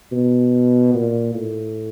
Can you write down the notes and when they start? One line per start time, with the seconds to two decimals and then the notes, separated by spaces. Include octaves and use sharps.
0.12 B2
0.94 A#2
1.35 A2